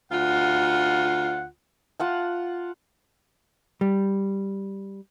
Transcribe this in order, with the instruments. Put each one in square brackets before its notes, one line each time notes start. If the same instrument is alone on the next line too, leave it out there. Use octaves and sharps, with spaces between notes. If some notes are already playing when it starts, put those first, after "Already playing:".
[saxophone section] D2 F4 [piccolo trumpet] F#5
[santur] F4 F#5 A5
[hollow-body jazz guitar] G3